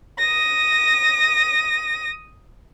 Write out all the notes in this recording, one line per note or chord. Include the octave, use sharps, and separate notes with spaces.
D#6 A#6